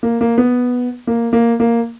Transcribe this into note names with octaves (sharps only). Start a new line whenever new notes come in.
A#3
A#3
B3
A#3
A#3
A#3